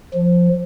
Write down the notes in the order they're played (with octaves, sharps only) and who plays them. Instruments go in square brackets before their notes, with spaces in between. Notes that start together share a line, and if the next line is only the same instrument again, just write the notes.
[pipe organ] F3